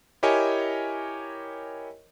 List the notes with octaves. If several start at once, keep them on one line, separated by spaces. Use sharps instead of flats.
E4 G4 A#4 C#5 D#5 G#5